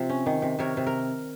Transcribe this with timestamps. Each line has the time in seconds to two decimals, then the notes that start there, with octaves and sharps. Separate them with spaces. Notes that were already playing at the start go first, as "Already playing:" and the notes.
Already playing: C3 F3
0.09 C#4
0.26 D#3
0.42 C3
0.59 C3 A#4 C#5
0.77 C3
0.87 A#4